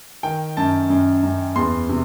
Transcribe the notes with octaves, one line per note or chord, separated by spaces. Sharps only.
D#3 G5
F#2 A5
F#2
F#2
E2 C6
C3